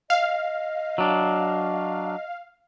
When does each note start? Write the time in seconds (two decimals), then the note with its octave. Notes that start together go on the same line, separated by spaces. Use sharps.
0.10 D#5 F5
0.98 F#3 D4